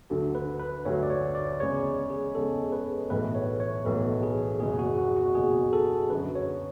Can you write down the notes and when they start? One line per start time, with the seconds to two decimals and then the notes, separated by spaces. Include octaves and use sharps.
0.10 D2 D3 F#3
0.35 B4
0.60 B4
0.85 D2 D3 F#3 C#5
1.03 D5
1.10 C#5
1.35 D5
1.60 E2 C#3 G#3 C#5
2.10 G#4
2.35 E2 C#3 G#3 A4
2.72 B4
3.10 B1 A2 E3 B3 B4
3.35 C#5
3.60 C#5
3.84 B1 A2 E3 B3 A4
4.23 G#4
4.60 F#1 E2 B2 G#4
4.79 F#4
4.98 F#4
5.16 F#4
5.35 F#1 E2 B2 G#4
5.73 A4
6.10 F#2 D3 F#3 B4
6.35 C#5